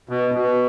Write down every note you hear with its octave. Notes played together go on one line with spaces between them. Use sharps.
B2
B2